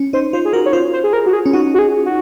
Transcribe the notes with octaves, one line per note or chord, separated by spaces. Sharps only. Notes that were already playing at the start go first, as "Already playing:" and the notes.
Already playing: C#4
D#4 C5
F4 C5
G#4
F#4 A#4
C#5
F4 C5
C5
G#4
A#4
F#4
G#4
C#4
D#4 F#4
F#4
G#4
F#4